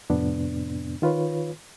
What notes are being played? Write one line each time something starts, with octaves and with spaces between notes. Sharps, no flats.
F2 A2 C3 B3 D4
D#3 F4 B4 C#5